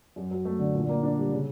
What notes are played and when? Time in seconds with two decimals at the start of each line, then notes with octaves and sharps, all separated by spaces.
0.16 F#2
0.31 F#3
0.45 A3
0.59 D3
0.75 A#2
0.89 A#3
1.03 D4
1.18 G3
1.32 C#3